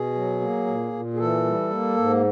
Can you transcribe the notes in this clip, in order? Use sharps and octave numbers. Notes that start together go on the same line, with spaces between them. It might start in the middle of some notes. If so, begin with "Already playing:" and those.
Already playing: B2 G#4
F#3
A#3
A#2
A#2
G#4
E3 A4
G3
A#3
G#2